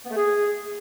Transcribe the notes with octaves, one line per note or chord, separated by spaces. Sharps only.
B3
A3
G#4